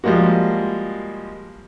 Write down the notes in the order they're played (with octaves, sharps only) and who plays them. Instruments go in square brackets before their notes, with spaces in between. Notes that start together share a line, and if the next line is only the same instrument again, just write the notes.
[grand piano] F3 G3 G#3 A#3 F#4